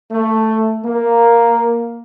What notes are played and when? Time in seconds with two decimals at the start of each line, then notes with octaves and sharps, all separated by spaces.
0.11 A3
0.84 A#3